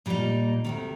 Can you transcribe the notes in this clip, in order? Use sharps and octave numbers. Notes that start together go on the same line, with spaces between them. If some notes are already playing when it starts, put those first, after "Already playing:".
A#2 G3 A#3 D#4
D2 C3 D#3